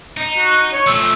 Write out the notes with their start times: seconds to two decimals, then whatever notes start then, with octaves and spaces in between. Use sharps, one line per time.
0.17 D#4
0.37 F#4
0.73 C#5
0.87 F3 A3 E6